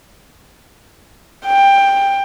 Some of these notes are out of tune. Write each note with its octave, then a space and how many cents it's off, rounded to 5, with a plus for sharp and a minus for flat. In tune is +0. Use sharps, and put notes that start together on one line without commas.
G5 +15